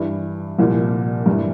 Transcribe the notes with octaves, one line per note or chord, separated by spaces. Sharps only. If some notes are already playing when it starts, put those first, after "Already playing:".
Already playing: G2 E3
C2 A#2 F3
G2 E3